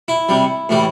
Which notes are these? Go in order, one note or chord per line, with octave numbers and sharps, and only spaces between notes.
E4
C3 G3
A2 E3 G3